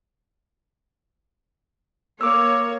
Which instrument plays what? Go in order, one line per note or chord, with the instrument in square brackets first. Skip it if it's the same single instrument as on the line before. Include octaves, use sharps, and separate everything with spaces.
[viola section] A#3 C#5 [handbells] D6 E6